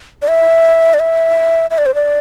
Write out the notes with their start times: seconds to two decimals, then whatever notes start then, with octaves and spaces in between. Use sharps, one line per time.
0.22 D5
0.28 E5
0.94 D5
1.00 E5
1.70 E5
1.78 D5
1.86 C5
1.95 D5